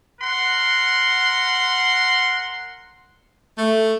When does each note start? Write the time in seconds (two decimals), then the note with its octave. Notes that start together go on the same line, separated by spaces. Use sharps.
0.21 A#4 F#5 C6
3.58 A3